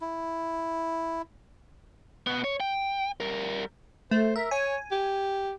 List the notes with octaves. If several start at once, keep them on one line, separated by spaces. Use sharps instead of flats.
E4
B2 B3
C#5
G5
G3 A#4
A3 C5
A#4 E5
C#5 G#5
G4